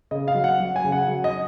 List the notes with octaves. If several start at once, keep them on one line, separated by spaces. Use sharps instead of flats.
C#3 D#5
F5
F#3
F#5
F#3
G#5
C#3
F#5
F#3
D#5